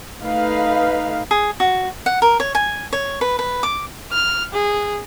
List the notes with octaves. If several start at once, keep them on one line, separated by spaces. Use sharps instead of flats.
A3 D#4 B4 F5
G#4
F#4
F#5
A#4
C#5
G#5
C#5
B4
B4
D6
F6
G#4